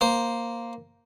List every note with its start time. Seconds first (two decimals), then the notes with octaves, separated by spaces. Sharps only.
0.01 A#3 C5